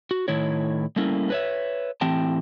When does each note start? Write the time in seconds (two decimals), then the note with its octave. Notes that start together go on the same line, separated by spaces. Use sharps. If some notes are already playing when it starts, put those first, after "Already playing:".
0.11 F#4
0.28 A2 D#3 E4 C#5
0.96 G3 A3 A#3 C#4 E4
1.30 B4 C#5 E5
2.01 A2 E3 C4 G4 G5 A5